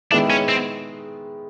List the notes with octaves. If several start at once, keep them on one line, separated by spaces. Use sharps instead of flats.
D#3 G#3 B3 D4 E4
C#4
C4